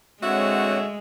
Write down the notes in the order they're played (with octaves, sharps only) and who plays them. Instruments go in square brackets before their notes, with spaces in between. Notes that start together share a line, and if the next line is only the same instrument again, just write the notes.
[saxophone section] D3 F#4 E5 [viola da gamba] G#3 [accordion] C4 C#5 F#5